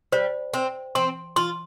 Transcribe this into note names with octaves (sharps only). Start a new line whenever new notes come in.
G3 C5
C4 C5
C4 C6
F4 C6